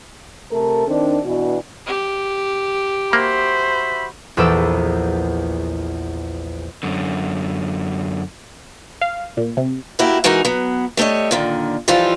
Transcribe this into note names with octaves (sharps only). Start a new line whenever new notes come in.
C3 A3 A4 A#4
D#3 C4 D4
B2 E3 D4 F#4
G4
A#3 F#4 C5 E5 B5
A#1 E2 E4 A4 D6 E6
F#2 D3
F5
A#2
C3
A3 A#3 E4 F#4 G4
E3 G#3 D#4 F#4 A#4
F#3 B3
G3 A3 G#4 C#5 D#5
A#2 D3 D#3
E3 F3 G3 D#4 F4 A4